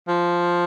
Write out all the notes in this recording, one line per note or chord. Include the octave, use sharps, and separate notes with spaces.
F3